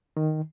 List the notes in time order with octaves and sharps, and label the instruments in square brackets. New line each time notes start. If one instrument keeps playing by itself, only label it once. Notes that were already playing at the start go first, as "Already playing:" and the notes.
[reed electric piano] D#3